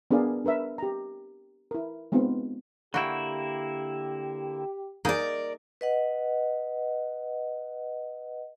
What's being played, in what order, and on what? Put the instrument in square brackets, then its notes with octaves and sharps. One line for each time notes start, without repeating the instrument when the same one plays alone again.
[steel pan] B3 D4 G#4 A#4 D5 F5
D4 A#4 B4 E5
G4 A#5
E4 A#4
G#3 B3 C4 D#4 F4
[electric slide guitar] D3 A#3 E4 [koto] F#4 G5 [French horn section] G4
[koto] A#3 D#4 G#4 [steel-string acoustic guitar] A#4 D5
[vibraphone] B4 D#5 F#5